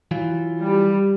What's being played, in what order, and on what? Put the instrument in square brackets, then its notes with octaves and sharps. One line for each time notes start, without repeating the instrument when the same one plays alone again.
[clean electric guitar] E3 F#3 F4
[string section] G3